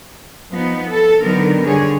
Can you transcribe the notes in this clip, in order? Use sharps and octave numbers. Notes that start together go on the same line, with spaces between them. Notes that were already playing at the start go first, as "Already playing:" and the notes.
F3 B3 D#4
A4
D3 D#3 F#3 B3 A#4
D3 G3 G#4 C#5